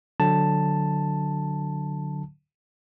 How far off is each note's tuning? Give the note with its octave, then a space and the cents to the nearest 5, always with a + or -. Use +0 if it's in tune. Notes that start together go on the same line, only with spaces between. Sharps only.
D3 +0 F#3 -15 A5 +5